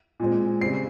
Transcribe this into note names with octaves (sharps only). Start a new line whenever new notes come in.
A#2 G#3 C4
C#3 G3 C4 C7